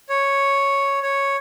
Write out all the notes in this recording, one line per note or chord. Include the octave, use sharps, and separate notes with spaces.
C#5
C#5